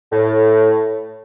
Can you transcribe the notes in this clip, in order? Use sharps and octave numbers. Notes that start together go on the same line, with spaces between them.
A2